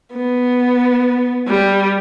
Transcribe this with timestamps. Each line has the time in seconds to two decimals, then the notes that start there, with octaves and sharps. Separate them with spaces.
0.13 B3
1.47 G3